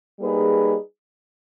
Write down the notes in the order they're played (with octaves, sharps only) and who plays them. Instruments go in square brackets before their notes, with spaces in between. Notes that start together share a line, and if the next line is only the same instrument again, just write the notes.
[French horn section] G3 A#3 D#4 G#4 B4